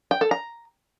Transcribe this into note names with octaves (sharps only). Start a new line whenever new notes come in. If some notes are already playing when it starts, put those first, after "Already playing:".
G5
A4
A#5